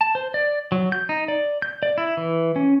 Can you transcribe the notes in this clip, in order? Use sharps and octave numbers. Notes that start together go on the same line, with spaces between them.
A5
C5
D5
F#3
G6
D#4
D5
G6
D5
E4
E3
C#4